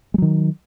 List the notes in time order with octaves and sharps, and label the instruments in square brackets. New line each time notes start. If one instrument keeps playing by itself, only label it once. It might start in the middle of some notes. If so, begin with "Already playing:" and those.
[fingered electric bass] G#3
F#3
D#3